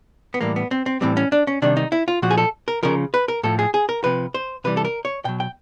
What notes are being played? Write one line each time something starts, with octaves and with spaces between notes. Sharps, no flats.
B3
A2 E3 G3 A#3
B3
C4
C4
A2 E3 G3 C4
C#4
D4
C#4
C3 D#3 G3 D4
D#4
E4
F4
A#2 F3 F#4
G#4
A4
A#4
C#3 F3 A#4
B4
A#4
A2 F3 A4
G#4
G#4
A#4
C3 F3 B4
C5
C3 E3 G3 B4
A4
A#4
C#5
B2 F#3 G5
G5